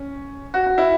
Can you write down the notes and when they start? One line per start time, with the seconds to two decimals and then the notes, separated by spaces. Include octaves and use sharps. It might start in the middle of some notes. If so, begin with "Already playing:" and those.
Already playing: C#4
0.54 F#4
0.66 F#4
0.78 E4